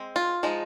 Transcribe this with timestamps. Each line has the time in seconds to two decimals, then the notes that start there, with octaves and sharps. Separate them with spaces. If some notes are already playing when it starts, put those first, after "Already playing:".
Already playing: G#3 C4
0.16 F4
0.43 F3 G#3 D#4